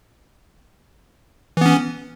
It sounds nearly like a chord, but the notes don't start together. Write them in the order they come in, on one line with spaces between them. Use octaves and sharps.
E3 B3 C#4